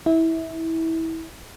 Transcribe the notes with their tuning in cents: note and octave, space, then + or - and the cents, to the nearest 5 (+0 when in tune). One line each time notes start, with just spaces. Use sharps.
E4 -25